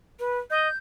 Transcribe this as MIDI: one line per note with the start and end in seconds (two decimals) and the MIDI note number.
0.19 0.39 71
0.50 0.68 75
0.50 0.77 91